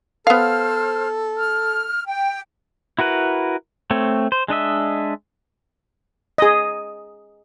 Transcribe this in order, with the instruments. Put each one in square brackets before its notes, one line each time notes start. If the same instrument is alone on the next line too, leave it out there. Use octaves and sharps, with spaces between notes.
[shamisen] B3 F5 [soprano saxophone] A4 [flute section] C5 F6
[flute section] F6
G5
[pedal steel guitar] E4 F#4 A#4 B4
A3 C4 C#5
C5
G#3 D4 D#5 E5
[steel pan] G#4 D#5